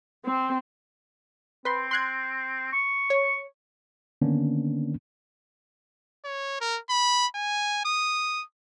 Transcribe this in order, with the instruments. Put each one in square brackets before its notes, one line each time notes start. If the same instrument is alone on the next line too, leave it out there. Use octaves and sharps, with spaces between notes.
[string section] C4
[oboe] C4 [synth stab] B4 C6
[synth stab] C6 F#6 G#6
[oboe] C#6
[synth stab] C#5
[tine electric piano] D3 D#3 A#3 B3 C#4 D4
[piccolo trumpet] C#5
A#4
B5
G#5
D#6